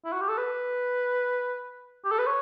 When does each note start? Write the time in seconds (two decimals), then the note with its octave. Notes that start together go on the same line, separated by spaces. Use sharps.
0.05 E4
0.13 F#4
0.21 G4
0.29 A4
0.38 B4
2.05 G4
2.11 A4
2.19 B4
2.26 C#5